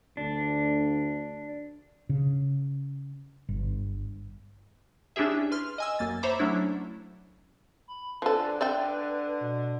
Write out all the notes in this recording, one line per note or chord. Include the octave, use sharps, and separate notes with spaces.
D2 D4
C#3
G1
C#4 D4 E4 G4 G#4 E5
B4 C6 F6
D#5 G#5 E6
F#2 A#3 A6
C5 C#5 E5 A#5 B5 D6
F#3 A3 C#4 D4 E4
B5
D3 F3 A4 B4
D3 D5 E5 G5
B2